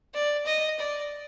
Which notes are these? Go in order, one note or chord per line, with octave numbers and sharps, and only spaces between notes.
D5
D#5
D5